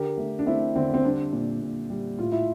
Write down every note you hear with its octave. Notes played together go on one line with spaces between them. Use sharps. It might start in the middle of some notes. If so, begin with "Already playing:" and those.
Already playing: D3 G4 A#4
A3
D4
A3 C4 E4
D3 C4
C4
G3 D4
A#2
A#2
G3
A2 F4
E4